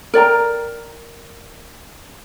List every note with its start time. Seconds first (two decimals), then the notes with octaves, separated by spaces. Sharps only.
0.14 A#4 D5 G5 A#5